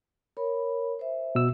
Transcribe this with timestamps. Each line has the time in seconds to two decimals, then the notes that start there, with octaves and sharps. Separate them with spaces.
0.37 A#4 C#5 B5
0.99 C5 E5
1.35 B2 E6